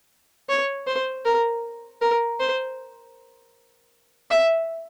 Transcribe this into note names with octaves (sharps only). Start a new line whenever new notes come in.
C#5
C5
A#4
A#4
C5
E5